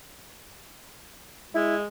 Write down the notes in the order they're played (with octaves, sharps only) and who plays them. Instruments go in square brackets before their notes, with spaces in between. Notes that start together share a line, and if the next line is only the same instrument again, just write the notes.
[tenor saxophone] G#3 [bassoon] E4